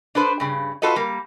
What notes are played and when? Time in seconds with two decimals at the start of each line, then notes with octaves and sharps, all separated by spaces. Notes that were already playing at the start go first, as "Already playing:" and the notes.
0.15 D4 A4 B4 C5
0.40 G2 C#3
0.82 F4 F#4 A4 B4 D#5
0.96 G3 A#3